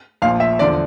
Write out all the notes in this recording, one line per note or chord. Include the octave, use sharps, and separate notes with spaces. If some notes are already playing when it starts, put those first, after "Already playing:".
A#1 A#2 F3 F5
E5
E2 D3 F3 D5